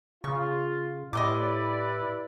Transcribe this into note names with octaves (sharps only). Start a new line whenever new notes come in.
C#3 F4 C#6
A2 E4 G4 B4 D5 D#5 C6 D6